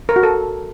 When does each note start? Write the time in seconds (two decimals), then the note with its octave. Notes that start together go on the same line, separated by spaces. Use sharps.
0.09 A#4
0.16 F#4
0.23 A4